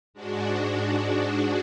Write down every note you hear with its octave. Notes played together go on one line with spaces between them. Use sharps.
G#2 G#3 D4 F#4